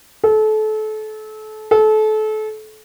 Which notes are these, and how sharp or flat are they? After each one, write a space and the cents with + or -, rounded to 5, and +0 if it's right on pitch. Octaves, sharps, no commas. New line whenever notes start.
A4 -30
A4 -30